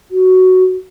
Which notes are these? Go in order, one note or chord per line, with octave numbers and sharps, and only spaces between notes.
F#4